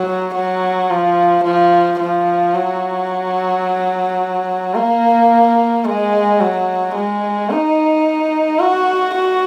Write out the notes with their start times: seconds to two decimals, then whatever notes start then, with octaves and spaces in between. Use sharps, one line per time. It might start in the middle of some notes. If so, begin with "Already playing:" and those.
Already playing: F#3
0.35 F#3
0.90 F3
1.45 F3
2.00 F3
2.55 F#3
4.75 A#3
5.85 G#3
6.40 F#3
6.96 G#3
7.50 D#4
8.60 F#4
9.15 F#4